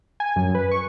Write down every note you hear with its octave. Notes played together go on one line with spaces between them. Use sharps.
G#5
F#2
B4
C#6